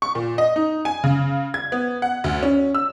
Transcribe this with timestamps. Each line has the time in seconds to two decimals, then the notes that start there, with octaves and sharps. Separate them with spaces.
0.02 C#6
0.15 A#2
0.38 D#5
0.56 D#4
0.85 G#5
1.04 C#3
1.54 G#6
1.72 B3
2.02 F#5
2.24 D2
2.43 C#4
2.75 E6